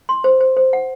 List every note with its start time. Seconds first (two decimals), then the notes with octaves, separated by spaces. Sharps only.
0.09 C6
0.24 C5
0.41 C5
0.57 C5
0.73 F#5